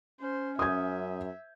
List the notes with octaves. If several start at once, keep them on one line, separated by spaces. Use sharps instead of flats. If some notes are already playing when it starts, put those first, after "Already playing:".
C#4 C5
F#2 E5 D#6 G6 G#6